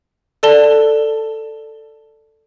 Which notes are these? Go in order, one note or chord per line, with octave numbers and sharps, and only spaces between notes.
A4 D5 A5 G7